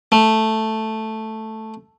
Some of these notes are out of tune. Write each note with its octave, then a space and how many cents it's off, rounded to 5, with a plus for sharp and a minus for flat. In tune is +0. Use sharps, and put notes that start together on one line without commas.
A3 +0